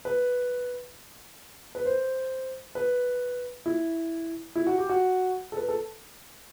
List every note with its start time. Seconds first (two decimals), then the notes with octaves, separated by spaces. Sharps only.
0.05 B4
1.75 B4
1.85 C5
2.75 B4
3.66 E4
4.55 E4
4.67 F#4
4.78 G4
4.89 F#4
5.52 A4
5.57 B4
5.68 A4